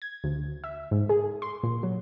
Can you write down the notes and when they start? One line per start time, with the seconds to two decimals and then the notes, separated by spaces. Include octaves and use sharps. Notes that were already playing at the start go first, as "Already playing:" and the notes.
0.02 G#6
0.24 D2
0.64 E5
0.91 G#2
1.09 G#4
1.42 C6
1.63 A#2
1.83 F#3